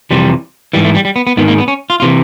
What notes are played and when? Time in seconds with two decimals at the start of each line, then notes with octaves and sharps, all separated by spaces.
0.11 F2 C3 E3 G3
0.73 G#2 E3 G3
0.85 A3
0.95 G3
1.05 G3
1.16 B3
1.27 B3
1.37 G#2 D#3 B3
1.48 A#3
1.58 B3
1.68 C#4
1.90 F4
2.00 C3 E3 F4